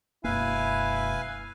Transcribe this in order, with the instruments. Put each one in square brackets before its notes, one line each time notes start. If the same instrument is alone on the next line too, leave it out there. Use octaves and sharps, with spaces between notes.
[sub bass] E1 [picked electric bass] F#2 A#3 [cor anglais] E4 [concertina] B4 F5 G#5